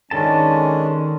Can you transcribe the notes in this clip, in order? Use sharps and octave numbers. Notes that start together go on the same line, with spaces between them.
D#3 G#3 C#4 D4 A4 A5